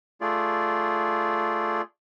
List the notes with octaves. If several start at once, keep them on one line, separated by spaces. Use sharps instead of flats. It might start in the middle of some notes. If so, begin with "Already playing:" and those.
A3 F4 G#4 D5